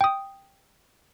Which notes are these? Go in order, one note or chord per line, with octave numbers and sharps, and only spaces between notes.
G5 D#6